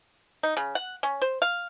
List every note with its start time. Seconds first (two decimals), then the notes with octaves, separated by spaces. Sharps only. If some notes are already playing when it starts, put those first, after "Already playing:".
0.43 D#4
0.57 C#3
0.75 F#5
1.03 C#4
1.22 C5
1.42 F5